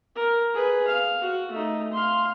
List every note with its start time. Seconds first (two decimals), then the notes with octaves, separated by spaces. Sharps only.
0.16 A#4
0.54 G#4 B4
0.88 F5
1.21 F#4
1.51 A3 D#4
1.93 F5 C6